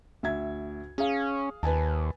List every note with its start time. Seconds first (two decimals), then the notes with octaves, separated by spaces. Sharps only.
0.23 D2 E5 G#6
0.98 C#4 G#4 F5
1.63 D#2 B4 G#5 A5